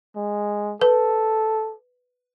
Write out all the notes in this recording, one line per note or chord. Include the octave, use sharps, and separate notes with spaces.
G#3
A4 B4